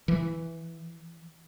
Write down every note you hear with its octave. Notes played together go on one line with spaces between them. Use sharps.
E3